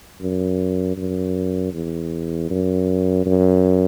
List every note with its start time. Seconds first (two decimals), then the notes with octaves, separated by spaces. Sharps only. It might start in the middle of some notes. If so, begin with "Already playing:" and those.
0.21 F#2
0.97 F#2
1.73 E2
2.50 F#2
3.26 F#2